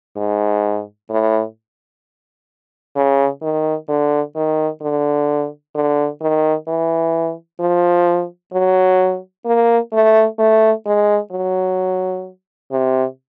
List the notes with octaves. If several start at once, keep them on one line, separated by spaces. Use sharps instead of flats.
G#2
A2
C#3
D#3
D3
D#3
D3
D3
D#3
E3
F3
F#3
A#3
A3
A3
G#3
F#3
C3